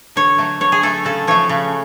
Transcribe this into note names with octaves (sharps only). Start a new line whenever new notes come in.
D3 C#5
F#3 A3
D3 C#5
G#4
F#3 A3 A4
C#3 A4
F3 A3 C#5
C#3